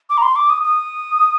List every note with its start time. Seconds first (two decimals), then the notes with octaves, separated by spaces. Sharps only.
0.10 D6
0.18 A#5
0.23 C6
0.36 D6
0.50 D#6
0.63 D#6